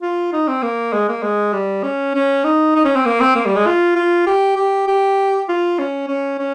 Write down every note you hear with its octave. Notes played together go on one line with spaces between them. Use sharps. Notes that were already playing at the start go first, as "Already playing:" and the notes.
F4
D#4
C4
A#3
G#3
A#3
G#3
G3
C#4
C#4
D#4
D#4
C#4
C4
A#3
C4
A#3
G3
G#3
F4
F4
G4
G4
G4
F4
C#4
C#4
C#4